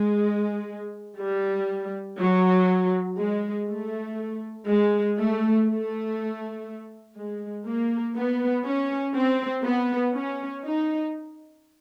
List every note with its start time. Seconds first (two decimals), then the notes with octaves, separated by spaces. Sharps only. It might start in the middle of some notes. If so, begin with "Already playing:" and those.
Already playing: G#3
1.20 G3
2.19 F#3
3.18 G#3
3.68 A3
4.67 G#3
5.18 A3
5.66 A3
7.16 G#3
7.66 A#3
8.15 B3
8.64 C#4
9.15 C4
9.64 B3
10.13 C#4
10.63 D#4